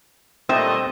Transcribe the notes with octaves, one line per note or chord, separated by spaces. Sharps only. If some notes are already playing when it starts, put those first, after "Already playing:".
A#2 G3 A3 C4 D#5 E5